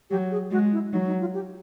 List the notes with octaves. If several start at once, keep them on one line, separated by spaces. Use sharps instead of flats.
F#3 G4
G#4
G#3 F#4
E4
F#3 D#4
D#4
F4
G4